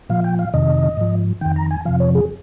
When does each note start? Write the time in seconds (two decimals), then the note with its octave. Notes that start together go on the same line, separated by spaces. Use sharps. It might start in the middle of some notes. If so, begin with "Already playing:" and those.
0.09 A#2 F3 F5
0.24 G5
0.39 F5
0.54 F2 C3 D#3 D#5
0.97 G#2 F3
1.41 F2 D#3 G5
1.56 A#5
1.71 G#5
1.85 F2 C3 F3 F5
2.00 C#5
2.15 G#4